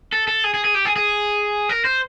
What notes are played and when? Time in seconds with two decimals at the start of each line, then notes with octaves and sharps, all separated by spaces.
0.13 A4
0.28 A4
0.44 G#4
0.54 G#4
0.65 G#4
0.75 G4
0.85 G#4
0.96 G#4
1.69 A#4
1.85 C5